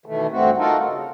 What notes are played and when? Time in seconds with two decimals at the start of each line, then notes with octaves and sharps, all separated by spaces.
0.06 B2 D#3 E3 A3
0.31 D2 G2 A3 C4 F#4
0.57 D#4 F4 F#4 A4 A#4
0.84 C#3